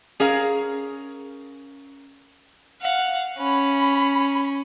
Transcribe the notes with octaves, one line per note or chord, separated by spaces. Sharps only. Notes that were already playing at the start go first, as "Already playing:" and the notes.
C#4 G#4 A#4 F5
F5 F#5
C#4 B5